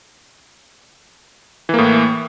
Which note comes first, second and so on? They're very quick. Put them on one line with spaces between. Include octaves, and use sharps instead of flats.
E3 A#3 A2